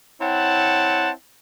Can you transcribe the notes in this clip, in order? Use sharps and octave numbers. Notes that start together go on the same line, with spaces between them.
C4 E4 C#5 F#5 G5 A5